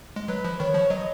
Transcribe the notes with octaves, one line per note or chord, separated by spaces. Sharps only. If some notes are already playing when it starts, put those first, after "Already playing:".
G#3
F#3 B4
F3
D#3 C#5
F3
F#3 D#5